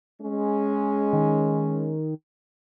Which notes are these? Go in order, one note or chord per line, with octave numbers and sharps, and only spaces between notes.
G#3 C#4
D#3